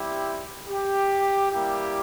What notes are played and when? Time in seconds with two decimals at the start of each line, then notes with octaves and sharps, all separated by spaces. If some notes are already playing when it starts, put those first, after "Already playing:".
Already playing: G3 C4 E4 G4
0.67 G4
1.51 G3 A#3 E4 G4